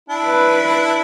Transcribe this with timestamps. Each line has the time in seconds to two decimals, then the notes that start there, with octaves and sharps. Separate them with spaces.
0.09 D4 E4
0.25 B4